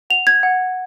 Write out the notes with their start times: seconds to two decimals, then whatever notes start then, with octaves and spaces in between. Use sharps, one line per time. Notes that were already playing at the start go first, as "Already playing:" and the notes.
0.10 F#5 F7
0.27 G#6
0.43 F#5